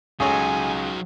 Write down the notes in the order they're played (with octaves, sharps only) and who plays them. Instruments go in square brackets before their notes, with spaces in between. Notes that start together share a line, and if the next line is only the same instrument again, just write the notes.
[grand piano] C#2 [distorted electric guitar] F#3 D#4 [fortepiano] G#4 A4 C#5 [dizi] G#5